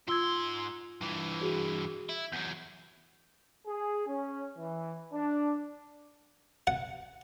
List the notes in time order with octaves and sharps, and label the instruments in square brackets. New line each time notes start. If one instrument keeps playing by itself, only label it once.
[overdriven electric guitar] G#2 C6 [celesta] F4 E6 G#6
[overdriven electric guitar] G2 E3
[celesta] F#4 G#4
[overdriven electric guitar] E4
[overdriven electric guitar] E2 F#3 [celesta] G6
[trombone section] G#4
C#4
E3
D4
[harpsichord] F#5